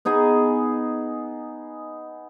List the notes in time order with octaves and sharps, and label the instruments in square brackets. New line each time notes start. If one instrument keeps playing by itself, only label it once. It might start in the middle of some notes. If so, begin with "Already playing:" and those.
[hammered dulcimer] B3 D#4 G#4 D#5